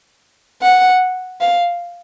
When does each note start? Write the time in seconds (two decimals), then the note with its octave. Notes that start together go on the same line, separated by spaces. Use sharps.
0.62 F#5
1.41 F5